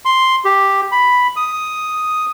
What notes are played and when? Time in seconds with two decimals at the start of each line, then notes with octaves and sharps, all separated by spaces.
0.05 C6
0.45 G4
0.92 B5
1.36 D#6